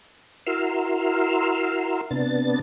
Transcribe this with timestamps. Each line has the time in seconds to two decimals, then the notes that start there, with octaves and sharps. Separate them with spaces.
0.46 E4 F#4 A#4 C6 E6 F6
2.11 C3 B3 D4 A6